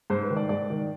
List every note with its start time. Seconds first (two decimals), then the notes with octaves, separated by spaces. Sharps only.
0.10 G#2 C5
0.23 B4
0.30 D#3
0.37 D5
0.49 G#2 D5
0.70 D#3